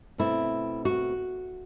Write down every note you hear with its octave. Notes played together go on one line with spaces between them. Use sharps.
B2 A3 C4 E4
F#4